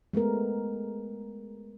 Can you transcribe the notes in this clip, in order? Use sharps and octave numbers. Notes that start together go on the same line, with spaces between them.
G#3 A3 B3 A#4